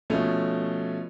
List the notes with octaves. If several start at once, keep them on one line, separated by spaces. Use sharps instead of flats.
B2 F3 A3 C#4